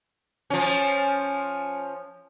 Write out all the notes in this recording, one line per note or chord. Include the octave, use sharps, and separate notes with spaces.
F3 C#4